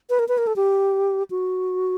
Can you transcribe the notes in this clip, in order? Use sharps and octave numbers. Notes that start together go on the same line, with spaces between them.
B4
A#4
B4
A#4
A4
G4
F#4